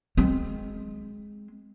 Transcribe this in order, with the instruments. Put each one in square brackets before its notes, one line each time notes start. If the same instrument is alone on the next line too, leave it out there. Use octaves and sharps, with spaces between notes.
[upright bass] G#3 C4